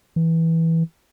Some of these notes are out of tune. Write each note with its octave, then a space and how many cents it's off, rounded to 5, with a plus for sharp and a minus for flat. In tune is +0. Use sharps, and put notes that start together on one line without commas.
E3 -10